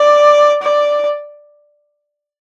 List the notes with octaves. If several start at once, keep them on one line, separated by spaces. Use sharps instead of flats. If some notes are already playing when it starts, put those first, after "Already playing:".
Already playing: D5
D5